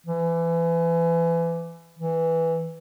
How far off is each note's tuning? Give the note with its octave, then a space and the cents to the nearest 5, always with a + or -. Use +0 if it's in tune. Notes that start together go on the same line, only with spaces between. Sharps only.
E3 +30
E3 -5